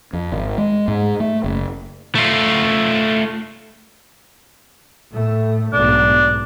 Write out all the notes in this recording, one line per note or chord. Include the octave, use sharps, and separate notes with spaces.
F2
G#1
G#3
G#2
A3
F#1
A3 F4
A2 A3
B1 G#2 D4